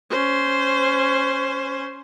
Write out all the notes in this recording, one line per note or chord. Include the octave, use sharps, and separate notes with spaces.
C#4 C5